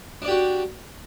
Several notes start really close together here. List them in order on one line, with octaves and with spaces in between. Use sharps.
D4 D5 G4 F#4